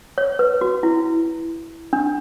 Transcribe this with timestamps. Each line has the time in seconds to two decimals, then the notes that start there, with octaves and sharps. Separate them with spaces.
0.18 C#5
0.39 B4
0.61 F#4
0.83 E4
1.93 D4